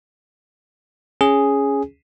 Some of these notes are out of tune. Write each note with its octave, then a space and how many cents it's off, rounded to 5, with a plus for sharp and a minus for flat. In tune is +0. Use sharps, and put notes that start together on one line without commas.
C#4 +5 G#4 +0